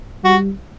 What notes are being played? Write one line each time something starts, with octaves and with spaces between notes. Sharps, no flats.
G3 F#4